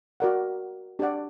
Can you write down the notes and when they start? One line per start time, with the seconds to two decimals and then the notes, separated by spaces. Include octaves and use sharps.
0.20 F#4 A#4 D5 F#5
0.99 D4 G4 D5 F#5